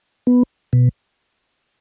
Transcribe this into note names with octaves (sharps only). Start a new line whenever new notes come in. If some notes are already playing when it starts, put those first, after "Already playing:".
B3
B2